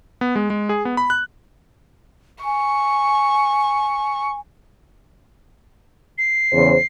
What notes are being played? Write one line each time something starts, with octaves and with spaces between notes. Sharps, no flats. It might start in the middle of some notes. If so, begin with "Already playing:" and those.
B3
G#3
G#3
G#4
B3
B5
F#6
G#5 C#6
C7
E2 C#3 C5